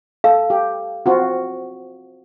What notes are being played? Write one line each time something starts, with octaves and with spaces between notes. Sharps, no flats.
A4 F5
G4
C4 F4 F#4